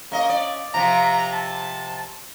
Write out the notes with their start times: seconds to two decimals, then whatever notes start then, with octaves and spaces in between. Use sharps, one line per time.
0.12 A#3 C#4 D#5
0.29 D5
0.74 C3 F3 A#5
1.33 A5